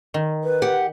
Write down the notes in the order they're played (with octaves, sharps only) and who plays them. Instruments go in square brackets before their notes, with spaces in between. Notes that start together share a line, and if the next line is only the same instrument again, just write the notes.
[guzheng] D#3
[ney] B4
[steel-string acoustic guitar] G4 F#5